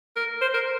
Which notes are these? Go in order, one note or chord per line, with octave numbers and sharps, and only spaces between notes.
A#4
C5
A#4